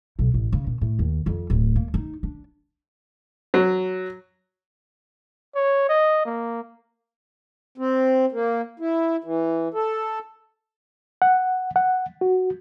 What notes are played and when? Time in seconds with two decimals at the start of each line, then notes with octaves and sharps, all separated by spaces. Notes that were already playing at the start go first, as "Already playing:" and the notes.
0.19 B1
0.34 A1
0.52 C#3
0.67 A#2
0.81 A2
0.99 D#2
1.26 F2
1.50 D1
1.76 A#3
1.94 D#4
2.23 D4
3.54 F#3
5.55 C#5
5.89 D#5
6.25 A#3
7.78 C4
8.32 A#3
8.80 E4
9.24 E3
9.74 A4
11.22 F#5
11.76 F#5
12.21 F#4